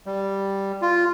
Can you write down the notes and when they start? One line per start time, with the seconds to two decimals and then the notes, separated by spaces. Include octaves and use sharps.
0.06 G3
0.82 F4